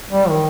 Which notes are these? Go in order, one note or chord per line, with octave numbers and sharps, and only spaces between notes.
G3
D#3